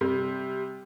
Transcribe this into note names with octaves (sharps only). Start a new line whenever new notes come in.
C3 G3